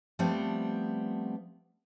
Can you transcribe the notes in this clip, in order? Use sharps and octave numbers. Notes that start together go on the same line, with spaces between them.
F3 G3 A3 B3 C4